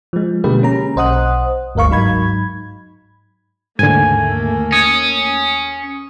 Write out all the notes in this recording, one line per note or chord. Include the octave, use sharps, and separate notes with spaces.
F3 G#3
B2 D3 G#3 A#3 G4 B4
A#3 C#4 A#5
B1 C5 D#5 F#5 D#6 F#6
G1 D2 A#4 F5 C#6
G#2 F#3 D#4 B5 G#6
D#2 G#2 D3 A3 A#3 G#5
C#4 D#6 G#6